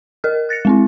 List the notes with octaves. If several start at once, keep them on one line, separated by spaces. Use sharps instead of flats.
A#4 D#5 F6
F#6 A6 A#6 C#7
G#3 C4 E4